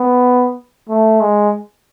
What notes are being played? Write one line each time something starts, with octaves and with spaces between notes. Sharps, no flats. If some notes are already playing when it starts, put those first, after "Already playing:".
Already playing: B3
A3
G#3